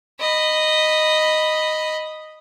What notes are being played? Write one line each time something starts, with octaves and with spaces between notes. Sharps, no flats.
D#5 B5